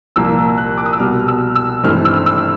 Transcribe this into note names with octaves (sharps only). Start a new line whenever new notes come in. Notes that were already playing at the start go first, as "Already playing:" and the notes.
C2 A#2 F3 A#3 E6
F#6
D6
D#6
E6
C2 B2 G3 B3 F6
F6
E6
E6
G#1 G2 E3 A3 C4 F6
E6
E6